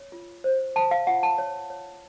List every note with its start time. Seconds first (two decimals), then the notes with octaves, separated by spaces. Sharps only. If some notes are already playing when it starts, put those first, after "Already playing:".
Already playing: C#5
0.12 F4
0.44 C5
0.76 C5 A5
0.91 F5
1.07 F4 F#5
1.23 A5
1.38 C#5
1.70 C#5